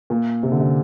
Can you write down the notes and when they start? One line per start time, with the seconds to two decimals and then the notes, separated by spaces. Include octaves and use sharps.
0.10 A#2
0.43 C3
0.52 D3
0.60 C3